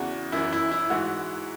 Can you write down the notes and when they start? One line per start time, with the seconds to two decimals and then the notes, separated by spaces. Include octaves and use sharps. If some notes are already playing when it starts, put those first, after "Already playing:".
Already playing: E2 C#3 E3 F#4
0.32 F#2 E3 E4
0.52 E4
0.71 E4
0.90 G#2 E3 F#4